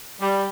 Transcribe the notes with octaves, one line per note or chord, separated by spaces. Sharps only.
G3